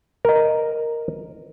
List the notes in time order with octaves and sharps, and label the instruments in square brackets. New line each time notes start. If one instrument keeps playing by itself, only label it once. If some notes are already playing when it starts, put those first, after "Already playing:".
[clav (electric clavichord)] A#4 D#5